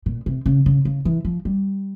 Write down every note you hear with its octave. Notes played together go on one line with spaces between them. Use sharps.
A#2
C3
C#3
C#3
C#3
E3
F3
G3